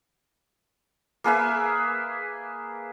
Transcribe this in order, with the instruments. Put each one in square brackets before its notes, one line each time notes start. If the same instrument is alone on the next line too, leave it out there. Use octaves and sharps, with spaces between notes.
[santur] A#3 G#4 B4 E5